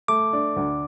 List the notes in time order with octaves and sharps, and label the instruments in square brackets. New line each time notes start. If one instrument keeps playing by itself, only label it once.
[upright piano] A3 [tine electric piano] D6
[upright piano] D4
D2